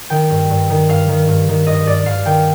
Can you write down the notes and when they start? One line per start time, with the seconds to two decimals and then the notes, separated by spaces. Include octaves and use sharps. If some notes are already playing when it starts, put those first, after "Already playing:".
0.10 D#3 G5
0.30 G2
0.50 G2
0.70 D#3
0.89 G2 F5
1.08 D#3
1.28 G2
1.48 D#3
1.67 G2 D#5
1.86 G2 D5
2.06 G2 F5
2.25 D#3 G5